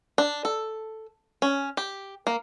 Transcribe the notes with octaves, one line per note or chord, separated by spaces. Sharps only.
D4
A4
C#4
G4
A#3